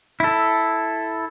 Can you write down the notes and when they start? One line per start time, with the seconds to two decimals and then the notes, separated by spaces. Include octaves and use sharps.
0.20 E4 A4